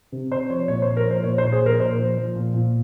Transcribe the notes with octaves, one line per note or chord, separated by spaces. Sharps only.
C3
C3 C5
F3 C#5
A#2 C#5
C5
F3
A#4
F3
C5
A#2 C#5
C5
A#2
G#4
F3
A#4
A#2 C5
F3
F3
A#2
A#2